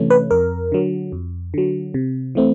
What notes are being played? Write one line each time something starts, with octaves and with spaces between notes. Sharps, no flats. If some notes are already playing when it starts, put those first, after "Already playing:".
Already playing: C3 E3 A3 C#4
B4
F2 A#4
D3 F#3
F2
D3 F#3
C3
E3 A3 C4